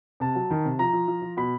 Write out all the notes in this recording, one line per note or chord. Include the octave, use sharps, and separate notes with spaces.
C3 A5
F#3
D#3
C3
F3 A#5
F3
F3
F3
B2 B5